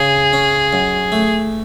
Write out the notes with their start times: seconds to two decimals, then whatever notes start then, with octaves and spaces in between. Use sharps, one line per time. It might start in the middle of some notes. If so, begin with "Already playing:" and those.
Already playing: C#3 G#4
0.33 C#4
0.73 F#2
1.12 A3